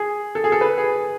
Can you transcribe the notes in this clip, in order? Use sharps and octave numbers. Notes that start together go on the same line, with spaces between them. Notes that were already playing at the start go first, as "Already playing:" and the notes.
Already playing: G#4
A4
G#4
A4
B4
G#4